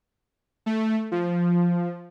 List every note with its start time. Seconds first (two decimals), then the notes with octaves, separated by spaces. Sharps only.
0.66 A3
1.12 F3